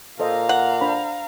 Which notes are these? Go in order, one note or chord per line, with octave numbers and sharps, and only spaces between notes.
A#2 A4 C5 D#5 F5 A#5
F#5
D4 C5 B5